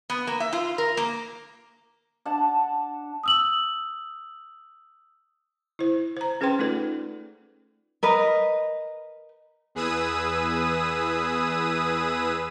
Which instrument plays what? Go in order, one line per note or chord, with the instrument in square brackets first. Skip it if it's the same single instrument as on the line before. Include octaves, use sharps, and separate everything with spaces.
[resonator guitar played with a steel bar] B3
A#3
E5
F4
A#4
A#3
[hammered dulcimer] D4 F#5 A5
[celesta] D#6 E6 F#7
[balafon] E4 C5
C5 A#5
C#4 G#4 B4 C5 G5 C6
A3 D#4 F4 A4 B4 D5
[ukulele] A#4 B4 D#5
[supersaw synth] E2 G#4 B4 D#6 E6 D#7